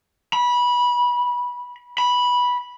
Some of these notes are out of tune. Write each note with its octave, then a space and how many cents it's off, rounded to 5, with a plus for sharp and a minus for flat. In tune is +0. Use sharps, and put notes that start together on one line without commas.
B5 -20
B5 -10